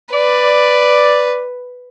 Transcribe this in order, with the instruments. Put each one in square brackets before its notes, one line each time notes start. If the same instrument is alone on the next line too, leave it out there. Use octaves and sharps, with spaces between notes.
[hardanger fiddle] B4 [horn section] D5